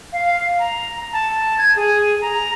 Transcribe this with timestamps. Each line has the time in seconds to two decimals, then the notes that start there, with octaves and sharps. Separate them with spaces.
0.12 F5
0.59 A#5
1.13 A5
1.58 G#6
1.76 G#4
2.21 A#5